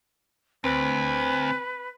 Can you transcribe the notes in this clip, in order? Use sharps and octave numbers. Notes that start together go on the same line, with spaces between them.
D2 C4 B4